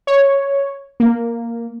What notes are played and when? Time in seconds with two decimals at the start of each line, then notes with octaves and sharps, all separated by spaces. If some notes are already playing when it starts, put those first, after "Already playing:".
0.07 C#5
1.00 A#3